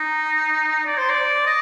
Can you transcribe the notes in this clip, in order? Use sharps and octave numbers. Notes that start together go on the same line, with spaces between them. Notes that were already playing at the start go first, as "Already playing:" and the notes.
Already playing: D#4
D5
C5
D5
D#5